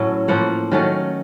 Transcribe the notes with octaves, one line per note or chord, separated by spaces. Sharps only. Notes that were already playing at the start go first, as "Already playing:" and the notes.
Already playing: A2 F#3 A3 C#4
A2 F3 A#3 F#5
D#3 F#3 A3 C#4